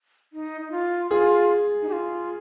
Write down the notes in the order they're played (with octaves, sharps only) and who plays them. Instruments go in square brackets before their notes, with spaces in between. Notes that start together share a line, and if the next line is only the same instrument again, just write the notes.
[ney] D#4
D#4
F4
[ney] F4 [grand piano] G#4
[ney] D#4
G4
F4